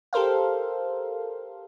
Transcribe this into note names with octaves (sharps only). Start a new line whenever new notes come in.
G4 A4 A#4 C5 F5